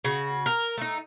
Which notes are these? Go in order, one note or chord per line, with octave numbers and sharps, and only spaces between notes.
C#3 F#4
A#4
A3 D#4